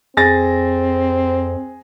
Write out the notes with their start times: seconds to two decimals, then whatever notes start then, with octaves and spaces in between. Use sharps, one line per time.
0.17 F2 C4 G#4 A6 A#6